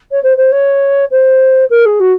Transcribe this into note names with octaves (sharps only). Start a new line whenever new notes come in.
C#5
C5
C5
C#5
C5
A#4
G#4
F#4